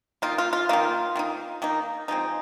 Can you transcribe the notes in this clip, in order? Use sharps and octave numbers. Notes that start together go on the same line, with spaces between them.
D#3 A#3 D#4 F4
F4
F4
D#3 A#3 D#4 F4
D#3 A#3 D#4
D#3 A#3 D#4
F3 G#3 C4 D#4